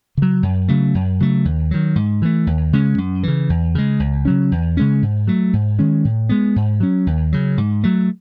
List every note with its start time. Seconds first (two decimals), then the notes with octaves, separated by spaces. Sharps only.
0.17 C#3 F#3
0.43 F#2
0.68 C#3 F#3 A3
0.95 F#2
1.20 C#3 F#3 A3
1.45 D#2
1.71 D#3 F#3
1.96 G#2
2.22 E3 A3
2.47 D#2
2.73 C#3 G#3 C#4
2.98 F#2
3.23 C#3 E3
3.50 E2
3.75 C#3 G#3
4.00 C#2
4.25 C#3 F#3 C#4
4.52 E2
4.77 C#3 G#3 C#4
5.02 G#2
5.27 F#3 A3
5.53 G#2
5.79 D#3 G#3 C#4
6.05 A2
6.29 G#3 B3
6.56 G#2
6.80 F#3 C#4
7.07 D#2
7.33 C#3 F#3
7.58 G#2
7.84 F#3 A3